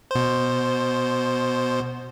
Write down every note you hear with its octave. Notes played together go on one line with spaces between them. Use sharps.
B2 C5